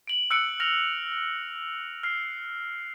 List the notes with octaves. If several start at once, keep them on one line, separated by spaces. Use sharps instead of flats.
D7 F#7
E6 F#6 C#7 D7 F#7
F6 A#6 F7
F6 C7